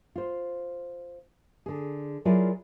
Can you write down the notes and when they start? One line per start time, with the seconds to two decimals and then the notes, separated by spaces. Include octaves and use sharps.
0.16 F4 C5
1.66 D3 G#4
2.25 F#3 E4 F4 G#4 A#4 D5